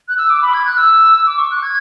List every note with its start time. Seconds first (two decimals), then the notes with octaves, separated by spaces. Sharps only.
0.08 F#6
0.18 E6
0.30 D6
0.42 B5
0.54 G#6
0.66 F#6
0.77 E6
1.26 D6
1.38 C#6
1.51 F#6
1.63 G#6